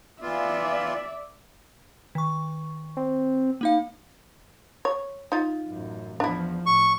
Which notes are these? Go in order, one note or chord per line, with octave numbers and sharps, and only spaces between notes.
E3 B3 F4 D5 E5
D#3 C#6
C4
A#3 D#4 F5
C#5
D#4 F4
A1 F#2
E2 F3 D4 E4
A2 C#6